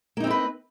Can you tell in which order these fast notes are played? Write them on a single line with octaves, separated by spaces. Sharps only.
A#3 D#4 C4 E4 B4